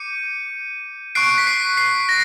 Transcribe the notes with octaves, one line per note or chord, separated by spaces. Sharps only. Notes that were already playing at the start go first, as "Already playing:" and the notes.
Already playing: D6 G6 C#7 D#7
C#6 F#6 C7 D7
B6
C7
C7
A#6